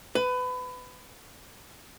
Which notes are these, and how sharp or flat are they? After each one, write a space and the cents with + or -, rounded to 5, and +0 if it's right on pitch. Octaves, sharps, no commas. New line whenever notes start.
B4 +25